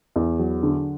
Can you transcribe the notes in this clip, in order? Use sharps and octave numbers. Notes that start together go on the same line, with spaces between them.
E2
F#3
D3